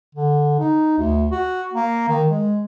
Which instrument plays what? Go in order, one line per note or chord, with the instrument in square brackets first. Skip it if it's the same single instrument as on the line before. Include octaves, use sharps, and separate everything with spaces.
[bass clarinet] D3
D#4
D2
F#4
A#3
D#3
G#3